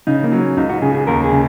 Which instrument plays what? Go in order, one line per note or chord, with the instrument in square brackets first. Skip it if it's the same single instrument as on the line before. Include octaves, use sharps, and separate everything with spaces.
[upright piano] C#3 [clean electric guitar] D#4
[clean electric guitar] A#3
[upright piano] F#3
[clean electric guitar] C#4
[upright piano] C#2 [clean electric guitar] D#4
[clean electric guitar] F#4
[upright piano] C#3 [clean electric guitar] G#4
[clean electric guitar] G#4
[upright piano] D#2 [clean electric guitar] A#4
[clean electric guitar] G#4
[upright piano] C#3